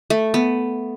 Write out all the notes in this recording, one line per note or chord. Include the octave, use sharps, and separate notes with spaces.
A3
B3